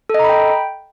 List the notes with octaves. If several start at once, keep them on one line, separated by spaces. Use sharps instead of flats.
A4 D#5 G5 A#5 B5